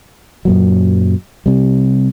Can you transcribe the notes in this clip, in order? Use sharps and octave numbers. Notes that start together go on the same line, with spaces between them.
F#2 A#2 F#3
C3 G3